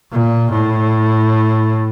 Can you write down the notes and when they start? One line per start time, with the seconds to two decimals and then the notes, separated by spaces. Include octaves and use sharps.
0.11 A#2
0.51 A2